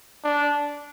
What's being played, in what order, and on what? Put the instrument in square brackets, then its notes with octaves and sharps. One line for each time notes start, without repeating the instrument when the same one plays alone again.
[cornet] D4